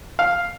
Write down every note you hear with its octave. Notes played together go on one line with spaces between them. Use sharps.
F5